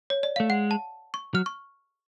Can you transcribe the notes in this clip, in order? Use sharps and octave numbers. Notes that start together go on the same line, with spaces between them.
C#5
D5
A3 F5
G#3 F#5
A5
C#6
F#3 F6
C#6